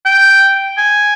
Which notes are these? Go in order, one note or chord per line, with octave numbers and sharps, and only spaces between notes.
G5
G#5